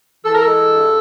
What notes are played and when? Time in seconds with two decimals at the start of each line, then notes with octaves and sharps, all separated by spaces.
0.24 E3 A4
0.32 A#4
0.41 A4
0.46 G#3
0.69 G2